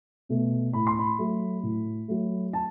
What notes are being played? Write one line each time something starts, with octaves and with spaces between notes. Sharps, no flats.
B2 A3
A2 B5
C6
B5
F#3 A3
A2
F#3 A3
A5